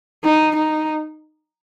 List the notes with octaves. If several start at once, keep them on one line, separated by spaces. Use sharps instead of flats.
D#4
D#4